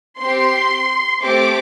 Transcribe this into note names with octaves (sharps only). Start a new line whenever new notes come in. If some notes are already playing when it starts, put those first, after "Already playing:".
C4 G4 C6
A3 C4 G4 D6